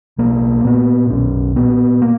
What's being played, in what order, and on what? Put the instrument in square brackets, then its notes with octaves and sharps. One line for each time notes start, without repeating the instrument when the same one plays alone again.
[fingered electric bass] B1 A#3
A#2 B3
B1 C#4
A#2 B3
A#3